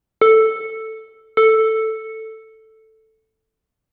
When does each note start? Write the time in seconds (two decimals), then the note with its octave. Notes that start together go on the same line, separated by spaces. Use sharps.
0.21 A4
1.37 A4